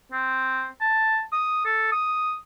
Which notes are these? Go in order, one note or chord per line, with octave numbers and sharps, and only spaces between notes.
C4
A5
D#6
A4
D#6